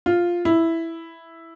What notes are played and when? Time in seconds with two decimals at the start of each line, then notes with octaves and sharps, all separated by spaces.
0.06 F4
0.45 E4